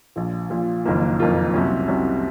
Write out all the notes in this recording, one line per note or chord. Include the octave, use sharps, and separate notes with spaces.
A#1 A#2 F3
A#1 A#2 F3
F#1 F2 D#3 A#3 F4
F#1 F2 D#3 A#3 F4
C2 C3 F#3 C#4
C2 C3 F#3 C#4